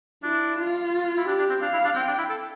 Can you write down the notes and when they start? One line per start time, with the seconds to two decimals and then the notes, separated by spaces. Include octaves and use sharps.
0.23 D4 E4
0.57 F4
1.17 E4
1.27 D4 G4
1.39 D4
1.50 C4
1.62 D4 F5
1.73 E4
1.85 D4
1.96 C4 G5
2.08 D4
2.18 E4
2.30 A4